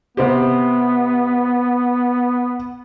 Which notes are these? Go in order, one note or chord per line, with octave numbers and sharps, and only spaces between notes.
C3 B3 C4 G4